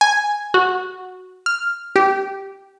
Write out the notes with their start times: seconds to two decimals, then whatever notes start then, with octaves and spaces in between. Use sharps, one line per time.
0.01 G#5
0.54 F#4
1.46 F6
1.96 G4